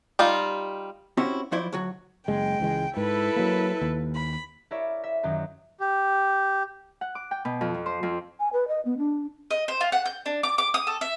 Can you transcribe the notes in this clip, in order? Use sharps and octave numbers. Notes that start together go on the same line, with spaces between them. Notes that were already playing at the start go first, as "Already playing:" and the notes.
G3 D#4 F4
C4 C#4 E4 F#4 G4 C#5
F3 F#3 E4 C5 D5
D2 F#3 F#4
F#1 G#3 G5
C#2 E3 G#3
G#2 E4 A4 B4
F#3 A#3
D#2
B5
E4 A#4 C#5 D5 E5
E5
F#2 D#3 F#3
G4
F#5
D6
G5
B2
F2
F3
C5
F2
G#5
B4
D#5
B3
D4
D#5
C5
F4
F#5
G6
D4
D6
D6
D#6
A4
E5